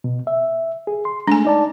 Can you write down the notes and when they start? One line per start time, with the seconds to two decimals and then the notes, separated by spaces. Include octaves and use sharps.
0.04 B2
0.27 E5
0.87 G#4
1.05 C6
1.27 G#3 A3 D4 G#5
1.45 D#4 D5 A5